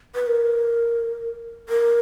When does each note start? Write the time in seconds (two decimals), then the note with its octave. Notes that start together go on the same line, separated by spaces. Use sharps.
0.15 B4
0.27 A#4
1.69 A#4